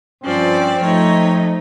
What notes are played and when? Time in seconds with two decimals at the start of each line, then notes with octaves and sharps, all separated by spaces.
0.24 G2 F3 C4 C#4 D5
0.81 F3 A3 D#4 C#5